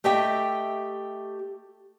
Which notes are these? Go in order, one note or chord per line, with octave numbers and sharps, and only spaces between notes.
A3 G4 D#5 E5 G5